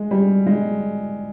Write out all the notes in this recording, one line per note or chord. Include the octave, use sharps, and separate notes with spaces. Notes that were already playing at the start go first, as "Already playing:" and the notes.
Already playing: G#3
G3
G#3